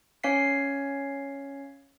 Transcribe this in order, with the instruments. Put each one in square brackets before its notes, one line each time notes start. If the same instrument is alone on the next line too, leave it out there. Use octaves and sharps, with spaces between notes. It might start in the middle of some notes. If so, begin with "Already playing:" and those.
[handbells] C#4 C#5 F5 B6 C7